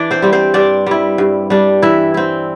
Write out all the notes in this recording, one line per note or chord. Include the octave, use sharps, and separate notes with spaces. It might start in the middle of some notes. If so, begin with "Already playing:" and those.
Already playing: E3 D4 D5
C4 C5
G3 C4
C4 C5
G2 D4 D5
G3 E4
G2
G3 D4
E3 E4 E5
C4 E4